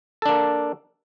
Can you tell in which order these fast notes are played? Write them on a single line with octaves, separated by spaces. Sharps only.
A4 D4 A#3